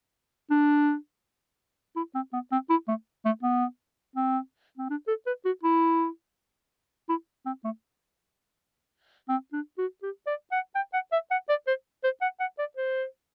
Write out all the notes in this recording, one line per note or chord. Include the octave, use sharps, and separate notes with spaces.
D4
E4
C4
B3
C4
E4
A3
A3
B3
C4
C4
D4
A4
B4
F#4
E4
E4
C4
A3
C4
D4
F#4
G4
D5
F#5
G5
F#5
E5
F#5
D5
C5
C5
F#5
F#5
D5
C5